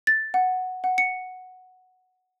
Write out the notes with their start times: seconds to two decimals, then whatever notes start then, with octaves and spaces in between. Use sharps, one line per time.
0.07 A6
0.34 F#5
0.84 F#5
0.98 C#7